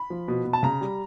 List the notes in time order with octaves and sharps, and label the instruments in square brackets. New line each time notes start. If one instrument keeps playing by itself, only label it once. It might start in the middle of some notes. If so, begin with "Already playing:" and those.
Already playing: [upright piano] B5
F3
B2
B2
A5
C#3 A#5
G3